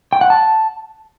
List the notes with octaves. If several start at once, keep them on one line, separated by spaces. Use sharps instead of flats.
G5
F#5
A5